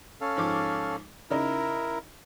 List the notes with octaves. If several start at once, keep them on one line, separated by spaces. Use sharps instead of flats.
C#4 A4 F5
G#2 F3 D6
C#3 D#4 E4 A#4